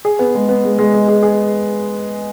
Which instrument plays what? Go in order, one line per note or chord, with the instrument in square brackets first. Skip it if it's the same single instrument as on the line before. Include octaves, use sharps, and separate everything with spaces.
[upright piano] G#4
B3
G#3
B3
G#3
G#3
G#3
G#4
G#4